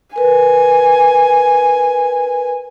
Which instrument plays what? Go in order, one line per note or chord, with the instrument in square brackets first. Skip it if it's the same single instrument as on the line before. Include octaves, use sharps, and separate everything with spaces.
[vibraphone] A#4 B4 [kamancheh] G#5